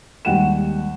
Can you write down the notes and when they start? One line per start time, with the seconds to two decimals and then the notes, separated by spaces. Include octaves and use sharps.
0.25 D#2 G3 G#3 F#5 G5 E7